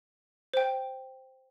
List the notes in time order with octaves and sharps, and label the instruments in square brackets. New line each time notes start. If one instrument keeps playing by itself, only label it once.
[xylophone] C5 G5